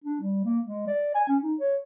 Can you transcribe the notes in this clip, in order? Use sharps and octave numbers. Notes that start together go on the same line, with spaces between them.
D4
G3
A#3
G#3
D5
G#5
C#4
D#4
C#5